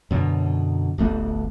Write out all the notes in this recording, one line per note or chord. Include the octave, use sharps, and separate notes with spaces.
F#2 B2 D3
D1 G1 A3 B3